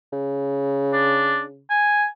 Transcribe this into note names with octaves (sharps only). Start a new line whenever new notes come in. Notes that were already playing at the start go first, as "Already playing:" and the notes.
C#3
D4
G#5